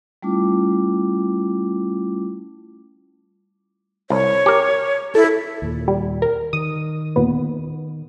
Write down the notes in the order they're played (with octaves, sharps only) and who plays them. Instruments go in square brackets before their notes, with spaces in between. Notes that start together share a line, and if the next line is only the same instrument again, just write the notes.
[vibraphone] G3 A3 C#4 E4 F4 D6
[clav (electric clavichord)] C2 [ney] C#5
[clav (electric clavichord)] G4 A#4
[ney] E4 [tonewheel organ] A4
[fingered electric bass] D#2 A#2
[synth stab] G3
A#4
[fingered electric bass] D#3 [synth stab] D#6
[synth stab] D#2 A#2 B3